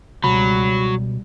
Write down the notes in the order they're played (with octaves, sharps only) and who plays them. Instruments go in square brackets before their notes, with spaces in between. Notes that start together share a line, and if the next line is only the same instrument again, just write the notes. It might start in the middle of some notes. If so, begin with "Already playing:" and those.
[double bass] C#2 G3 [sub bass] B2 [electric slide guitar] F#3 [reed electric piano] B5